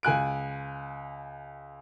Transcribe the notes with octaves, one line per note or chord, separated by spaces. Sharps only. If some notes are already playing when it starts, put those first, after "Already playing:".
C#2 G#5 F#6 D7